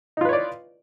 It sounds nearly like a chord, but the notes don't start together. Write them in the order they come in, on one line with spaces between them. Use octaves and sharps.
D#4 F4 B4 C#5 D5